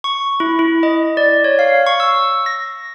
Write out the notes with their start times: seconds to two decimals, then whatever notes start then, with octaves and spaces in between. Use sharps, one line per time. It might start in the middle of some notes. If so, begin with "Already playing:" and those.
0.04 C#6
0.40 E4
0.59 E4
0.83 D#5
1.17 D5
1.44 C#5
1.59 F5
1.87 C#6
2.00 E6
2.46 A#6